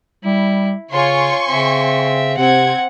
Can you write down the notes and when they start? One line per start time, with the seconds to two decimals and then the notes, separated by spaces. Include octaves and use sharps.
0.24 G3 E4
0.91 C#3 F4 C#5 G#5 C6 C#6
1.49 C#3 C4 E5
2.37 C3 C4 F#5 G#6